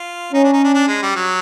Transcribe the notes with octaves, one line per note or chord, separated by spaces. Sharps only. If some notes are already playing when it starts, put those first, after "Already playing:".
Already playing: F4
C#4 D#4
D4
D#4
D4
D4
G#3
G3
F#3